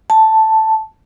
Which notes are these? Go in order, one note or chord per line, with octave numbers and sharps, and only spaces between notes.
A5